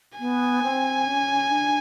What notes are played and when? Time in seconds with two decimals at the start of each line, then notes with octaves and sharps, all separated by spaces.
0.19 B3 G#5
0.63 C4
1.06 C#4
1.50 D4